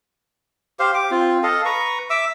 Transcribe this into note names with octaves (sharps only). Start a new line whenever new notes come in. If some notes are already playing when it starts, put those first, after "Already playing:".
G4 C5 F5
G4 D6
C4 F4
A4 D#5 F5
B4 A#5 C#6
E5 D6 E6